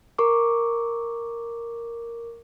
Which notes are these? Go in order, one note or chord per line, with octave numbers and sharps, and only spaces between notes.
A#4 C#6 D6